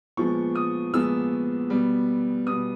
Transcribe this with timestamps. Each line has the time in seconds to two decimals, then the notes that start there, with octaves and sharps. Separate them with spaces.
0.17 A#2 F3 G#3 B3 C#6
0.55 D#6
0.94 A#2 F3 G#3 B3 E6
1.70 B2 G3 B3
2.46 B2 G3 B3 D#6